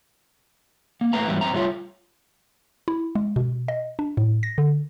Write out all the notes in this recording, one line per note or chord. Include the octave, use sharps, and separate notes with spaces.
A#3
A2 A3 B4 F5 A#5
G#2 E3 F#3 G3 B3 E4
F#2 C4 A#5
F#3 G3 A3 F4 C#5
E4
G#3
B2
D#5
D4
A2
A#6
D3